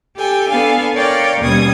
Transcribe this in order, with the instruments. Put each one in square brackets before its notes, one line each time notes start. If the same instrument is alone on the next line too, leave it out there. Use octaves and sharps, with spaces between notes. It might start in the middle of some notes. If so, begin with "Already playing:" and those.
[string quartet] G4 A4 G5 G#5
B3 D4 A4 F5 G#5
A#4 C#5 D5 F5 G5
D#2 B2 G3 C#4 D#6 G#6